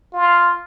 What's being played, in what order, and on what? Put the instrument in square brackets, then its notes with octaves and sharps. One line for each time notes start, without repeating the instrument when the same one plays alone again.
[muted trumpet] F4